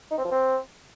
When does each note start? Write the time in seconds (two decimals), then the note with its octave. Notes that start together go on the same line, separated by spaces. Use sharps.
0.11 D#4
0.18 C4
0.25 F3
0.31 C4